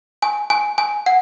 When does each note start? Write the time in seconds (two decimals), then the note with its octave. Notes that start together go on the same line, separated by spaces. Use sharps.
0.22 G#5
0.50 G#5
0.78 G#5
1.06 F#5